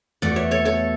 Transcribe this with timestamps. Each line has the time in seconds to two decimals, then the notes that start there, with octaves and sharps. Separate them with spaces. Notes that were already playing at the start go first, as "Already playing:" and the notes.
0.22 E2 B2 A3 D5 F#5
0.36 C#5 E5
0.51 A4 C#5
0.65 A4 C#5